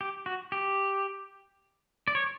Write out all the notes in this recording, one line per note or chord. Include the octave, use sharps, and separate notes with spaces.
G4
F#4
G4
D5
C#5